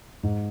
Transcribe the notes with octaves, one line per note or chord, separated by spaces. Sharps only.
G#2